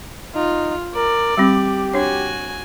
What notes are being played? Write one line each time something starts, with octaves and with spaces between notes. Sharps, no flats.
D#4 F4
A#4 D5
G3 C4 G4
D4 F#4 C#5 G#5